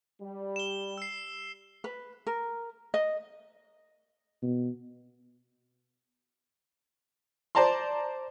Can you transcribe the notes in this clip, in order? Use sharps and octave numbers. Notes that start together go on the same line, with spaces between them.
G3
E7 G7
E6 C7
B4
A#4
D#5
B2
C5 D5 A5 A#5 C6